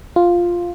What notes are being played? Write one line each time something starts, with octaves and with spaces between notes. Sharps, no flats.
F4